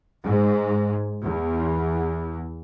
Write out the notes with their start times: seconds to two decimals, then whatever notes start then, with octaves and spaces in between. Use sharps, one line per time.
0.25 G#2
1.20 E2